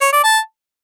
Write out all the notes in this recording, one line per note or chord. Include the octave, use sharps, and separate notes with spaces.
C#5
D5
A5